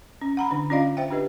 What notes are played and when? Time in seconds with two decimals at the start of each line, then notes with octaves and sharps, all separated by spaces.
0.22 C#4
0.37 F#5 A#5 B5
0.51 D3 D4
0.70 C#4 D4 F4 D5 D#5 F5
0.97 C5 E5 G5
1.10 D4 G4 B4 D#5